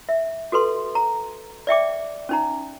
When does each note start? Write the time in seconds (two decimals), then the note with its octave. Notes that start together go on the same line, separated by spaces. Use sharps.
0.09 E5
0.52 F#4 A4 B4 C6
0.95 A#5
1.67 D5 E5 G5 D6
2.29 C#4 D#4 A#5